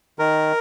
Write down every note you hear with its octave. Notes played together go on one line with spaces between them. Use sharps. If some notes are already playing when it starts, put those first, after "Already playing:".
D#3 A#4